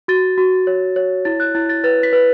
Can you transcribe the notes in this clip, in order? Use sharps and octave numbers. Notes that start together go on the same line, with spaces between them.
F#4 A6
F#4
C#5
C#5
E4 A6
F#6
E4 A6
A6
B4 A6
B6
B4